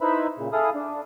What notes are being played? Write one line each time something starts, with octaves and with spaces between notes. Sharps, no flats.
D#4 E4 B4 C5 E5 B5
A#2 C#3
E4 G#4 A4 F5 D#6
D4